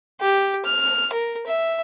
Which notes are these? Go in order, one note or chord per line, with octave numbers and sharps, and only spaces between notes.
G4
F6
A#4
E5